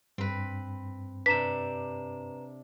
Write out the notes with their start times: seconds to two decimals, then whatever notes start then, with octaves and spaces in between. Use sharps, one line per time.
0.18 G2 C4 B4
1.26 C3 D4 B4 A#5 B6 E7